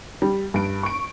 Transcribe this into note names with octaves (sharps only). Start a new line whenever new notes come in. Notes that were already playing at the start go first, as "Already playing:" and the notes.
G3
G2 D7
C#6 D7